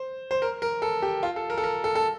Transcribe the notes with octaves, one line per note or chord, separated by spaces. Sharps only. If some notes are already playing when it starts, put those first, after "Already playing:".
Already playing: C5
C5
A#4
A#4
A4
G4
F4
A4
A#4
A4
A#4
A4
A4